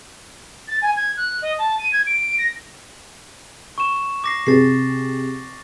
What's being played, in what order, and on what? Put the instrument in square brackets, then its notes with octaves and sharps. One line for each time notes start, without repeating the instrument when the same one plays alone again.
[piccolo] A6
G#5
G#6
F#6
D#5
A5
D#7
G#6
D7
A#6
[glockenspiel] C#6 E7
D6 A#6 C7
[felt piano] C3 G#4 [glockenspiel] A6 C7